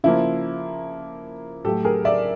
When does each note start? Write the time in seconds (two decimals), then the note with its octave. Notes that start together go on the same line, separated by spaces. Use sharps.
0.04 C#3 F3 A#3 E4
1.65 A2 F#3 A3 G4 A4
1.85 G#4 A#4
2.05 D5 E5